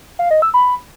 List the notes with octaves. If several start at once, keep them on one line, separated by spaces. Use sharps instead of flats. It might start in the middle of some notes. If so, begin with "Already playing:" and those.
F5
D#5
E6
B5